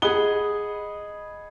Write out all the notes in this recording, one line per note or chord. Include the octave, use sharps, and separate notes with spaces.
G#4 D#5 F#5 B5 G7